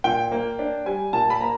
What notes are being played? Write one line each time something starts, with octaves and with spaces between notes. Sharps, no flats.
A#2 G5
A#3
D4
G3 G#5
A#2 A5
B5
A#3 A#5